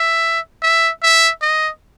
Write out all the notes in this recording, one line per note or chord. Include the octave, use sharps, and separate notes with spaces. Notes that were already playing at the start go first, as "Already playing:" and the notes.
Already playing: E5
E5
E5
D#5